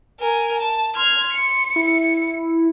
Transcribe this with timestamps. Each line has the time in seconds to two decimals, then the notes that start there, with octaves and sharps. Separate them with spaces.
0.20 A#4 G#5
0.61 A5
0.96 C6 F6 G#6
1.33 C#7
1.76 E4